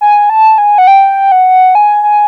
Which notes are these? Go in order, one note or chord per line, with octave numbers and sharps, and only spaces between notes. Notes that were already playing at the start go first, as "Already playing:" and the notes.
G#5
A5
G#5
F#5
G5
F#5
G#5
G#5